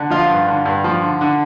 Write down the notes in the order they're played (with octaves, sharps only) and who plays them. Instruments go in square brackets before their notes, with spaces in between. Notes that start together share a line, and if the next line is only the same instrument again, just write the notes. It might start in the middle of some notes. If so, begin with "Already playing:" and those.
Already playing: [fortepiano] D3
F3 F4
G2
D3
G2
F3
D3
D3